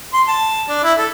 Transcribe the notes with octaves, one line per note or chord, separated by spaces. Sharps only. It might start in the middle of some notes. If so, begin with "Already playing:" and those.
C6
A5
D4
E4
A4